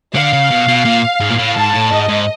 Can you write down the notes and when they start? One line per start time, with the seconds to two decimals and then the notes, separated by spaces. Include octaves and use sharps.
0.15 D3 F5
0.33 C#3
0.51 B2
0.68 B2
0.85 A#2
1.21 G#2
1.31 A#2
1.38 A2
1.55 G#2 A5
1.73 A2
1.91 G#2 D#5
2.09 G#2